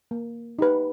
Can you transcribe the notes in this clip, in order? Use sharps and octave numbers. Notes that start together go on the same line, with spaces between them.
A#3
D#4 G4 B4